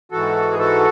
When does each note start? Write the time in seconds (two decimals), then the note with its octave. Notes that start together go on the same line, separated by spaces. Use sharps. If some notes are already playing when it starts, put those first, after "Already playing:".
0.12 G#2 E3 F#4 A4
0.51 G#4
0.59 F#4 A4